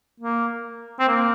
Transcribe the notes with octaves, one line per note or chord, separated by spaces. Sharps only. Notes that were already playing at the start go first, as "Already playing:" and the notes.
A#3
C4
A#3